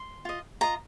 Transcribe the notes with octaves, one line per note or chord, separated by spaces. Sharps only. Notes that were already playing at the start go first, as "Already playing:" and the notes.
Already playing: C6
F4 D#5
F4 D#5 A#5